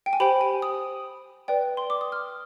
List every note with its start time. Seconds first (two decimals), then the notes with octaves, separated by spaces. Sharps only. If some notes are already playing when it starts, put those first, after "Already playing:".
0.06 G5
0.13 G#5
0.20 G4 C5 G5 B5
0.41 G#5
0.62 D#6
1.48 B4 D5 G5
1.77 C6
1.90 D6
2.01 D#6
2.12 F6